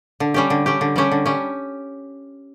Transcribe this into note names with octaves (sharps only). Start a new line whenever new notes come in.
D3
G3 C#4 G4
D3
G3 C#4 G4
D3
G3 C#4 G4
D3
G3 C#4 G4